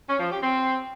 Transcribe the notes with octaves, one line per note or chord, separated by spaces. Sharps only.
C#4
F3
G4
C4